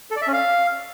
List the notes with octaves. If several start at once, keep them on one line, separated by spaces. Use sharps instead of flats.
A4
D5
E5
C#4
F5